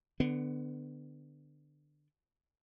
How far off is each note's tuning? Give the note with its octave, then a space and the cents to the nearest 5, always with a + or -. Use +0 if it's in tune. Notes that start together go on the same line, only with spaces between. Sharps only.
D3 +15 B3 +25